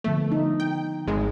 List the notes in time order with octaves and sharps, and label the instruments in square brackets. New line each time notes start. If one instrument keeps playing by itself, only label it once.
[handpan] D3 F3 B3 [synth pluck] A3
[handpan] D#4
[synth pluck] G5
G#1 G#3